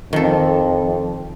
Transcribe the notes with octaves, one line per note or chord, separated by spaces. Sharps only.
F2 D#3 A4